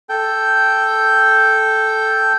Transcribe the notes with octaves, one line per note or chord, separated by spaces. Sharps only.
A4 G5